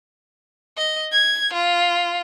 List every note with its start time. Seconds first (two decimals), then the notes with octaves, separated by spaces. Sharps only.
0.77 D#5
1.12 G#6
1.54 F4